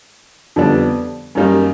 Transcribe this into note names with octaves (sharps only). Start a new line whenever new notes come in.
F2 D3 G3 B3 D4
F#2 D#3 G3 A#3 D#4